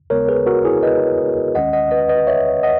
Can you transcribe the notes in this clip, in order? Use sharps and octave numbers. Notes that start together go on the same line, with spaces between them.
D#2 C#3 G#3 B3 A#4 C#5
G#4 B4
F#4 A#4
E4 G#4
B4 D#5
D#2 D#3 G#3 C#4 D#5 F#5
D#5 F#5
B4 D#5
B4 D#5
C#5 E5
D#5 F#5